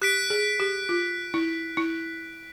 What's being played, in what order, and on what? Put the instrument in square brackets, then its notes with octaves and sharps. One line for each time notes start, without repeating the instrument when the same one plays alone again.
[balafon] G4 [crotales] F#6 B6 D7
[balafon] G#4
G4
F4
E4
E4